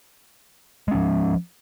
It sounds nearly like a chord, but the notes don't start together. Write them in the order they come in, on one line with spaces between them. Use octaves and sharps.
G#3 C#4 F3